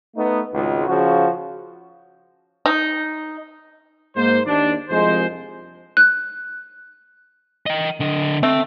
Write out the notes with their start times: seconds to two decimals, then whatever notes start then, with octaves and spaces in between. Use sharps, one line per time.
0.16 A3 B3 D#4
0.53 G#1 C#2
0.88 C#3 F3 F#4
2.66 D#4
4.16 G#2 A#3 C5
4.46 D#2 D4
4.90 C2 F2 G#3 C5
5.97 F#6
7.66 D#5 G5
8.00 D3 D#5
8.43 A3 C4